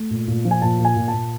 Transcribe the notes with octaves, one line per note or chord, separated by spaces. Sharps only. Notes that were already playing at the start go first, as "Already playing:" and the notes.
Already playing: A3
A#2
A#2
F3
G#5
A#2 A5
A#2
G#5
A#2
A5
A#2